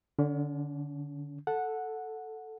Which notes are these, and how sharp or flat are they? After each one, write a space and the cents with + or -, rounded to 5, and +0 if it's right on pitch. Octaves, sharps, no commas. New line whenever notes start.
D3 +0 C#4 +40
A4 +0 F#5 -10